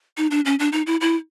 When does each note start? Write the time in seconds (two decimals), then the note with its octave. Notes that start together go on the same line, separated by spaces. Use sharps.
0.17 D#4
0.31 D4
0.46 C#4
0.59 D4
0.72 D#4
0.87 E4
1.01 E4